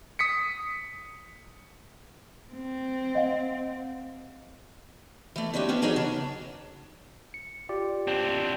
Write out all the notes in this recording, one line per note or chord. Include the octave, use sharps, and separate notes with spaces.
D#6 B6 C#7
C4
D#5 F5 F#5
E3 A3
D3 E3 C#4 D#4 F#4 G4
B3 C#4 D4 F#4
E3 F#3 D#4 G#4 C#5 D#5
C#3 D4
C#7
F4 G4 D5
C4 D4